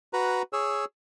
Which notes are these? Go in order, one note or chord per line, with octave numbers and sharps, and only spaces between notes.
F#4 B4 A#5
G#4 C#5 E6